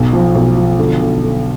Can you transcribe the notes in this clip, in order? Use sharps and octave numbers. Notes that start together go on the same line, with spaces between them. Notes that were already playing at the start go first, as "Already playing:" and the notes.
Already playing: B1
F3
B1
F3
D3
D3
D3